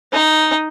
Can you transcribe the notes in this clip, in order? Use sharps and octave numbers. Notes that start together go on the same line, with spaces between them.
D#4